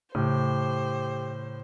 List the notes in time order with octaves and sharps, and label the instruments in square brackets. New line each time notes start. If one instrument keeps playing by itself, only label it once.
[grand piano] A2 [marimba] C#3 [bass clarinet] G4 [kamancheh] C5